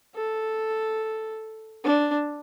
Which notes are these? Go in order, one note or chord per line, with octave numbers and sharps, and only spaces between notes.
A4
D4